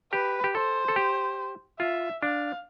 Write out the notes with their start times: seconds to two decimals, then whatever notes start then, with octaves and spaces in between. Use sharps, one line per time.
0.13 G4 B4
0.44 G4
0.55 A4 C5
0.88 A4
0.96 G4
1.80 F4 E5
2.22 D4 F5